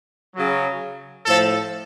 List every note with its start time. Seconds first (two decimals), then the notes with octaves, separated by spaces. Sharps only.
0.36 C#3 F#3
1.25 A2 F3 A4